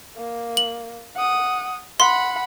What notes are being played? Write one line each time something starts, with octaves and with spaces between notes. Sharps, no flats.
A#3
F#7
F#5 D#6
F#5 B5 C6